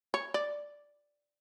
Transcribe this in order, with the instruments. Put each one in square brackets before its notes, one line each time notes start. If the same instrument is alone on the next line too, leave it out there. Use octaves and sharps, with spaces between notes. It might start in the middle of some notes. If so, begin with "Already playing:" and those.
[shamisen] C#5
D5